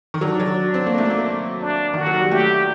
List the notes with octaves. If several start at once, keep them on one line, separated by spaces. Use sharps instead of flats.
D#3
F#3 D4
F#3
C4
A#3
A3
A#3
D4
D#3 F#4
F#3
G3
A3 G4